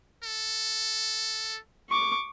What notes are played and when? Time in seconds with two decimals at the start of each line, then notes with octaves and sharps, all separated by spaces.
0.24 A4
1.90 C#6 D6